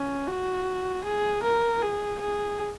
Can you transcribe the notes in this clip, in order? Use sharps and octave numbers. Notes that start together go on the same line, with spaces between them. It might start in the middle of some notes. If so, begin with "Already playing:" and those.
Already playing: C#4
F#4
G#4
A#4
G#4
G#4